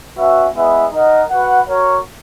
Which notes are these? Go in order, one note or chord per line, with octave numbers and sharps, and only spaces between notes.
C#4 F#4 B4 E5
G#3 B3 E4 B4 E5
D#4 A#4 D#5 F#5
F#4 B4 F#5
F#4 A#4 C#5